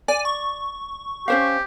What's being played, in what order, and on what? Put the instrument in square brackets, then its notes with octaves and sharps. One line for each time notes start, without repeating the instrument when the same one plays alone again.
[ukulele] D5 [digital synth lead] G#5
[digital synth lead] C#6
[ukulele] C#4 C5 F5 [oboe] G4